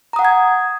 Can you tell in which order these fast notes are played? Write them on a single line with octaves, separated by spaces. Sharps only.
A#5 D#6 F#5 G5 G#6